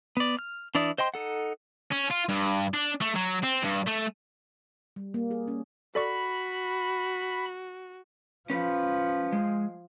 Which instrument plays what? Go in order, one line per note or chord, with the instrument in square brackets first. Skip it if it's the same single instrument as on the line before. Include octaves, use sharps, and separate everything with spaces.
[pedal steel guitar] B3 D5
F6
E3 D4 E4 D5 D#6
C5 D#5 G5 C6
D#4 A4 F#5
[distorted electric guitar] C#4
F4
G2
D4
A3
F#3
C4
G2
A3
[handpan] G3
A#3
G#4
C#4
[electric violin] F#4 [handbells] A4 D5 C#6 [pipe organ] B5
[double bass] F3 [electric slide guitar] C#4 B4
[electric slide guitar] G#3